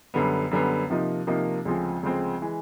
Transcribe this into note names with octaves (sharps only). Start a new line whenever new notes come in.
F#2 D3 G3 B3
F#2 D3 G3 B3
C3 F3 A#3 D#4
C3 F3 A#3 D#4
D2 C#3 F3 G#3 C4
D2 C#3 F3 G#3 C4
E3 G#3